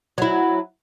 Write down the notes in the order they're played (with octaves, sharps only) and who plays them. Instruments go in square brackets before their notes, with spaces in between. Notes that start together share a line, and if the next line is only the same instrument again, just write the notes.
[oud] F#3 E4